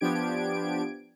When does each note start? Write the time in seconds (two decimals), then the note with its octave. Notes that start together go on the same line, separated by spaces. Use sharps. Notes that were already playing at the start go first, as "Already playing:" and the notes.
0.01 F3 B3 D4 G4 G#6 D7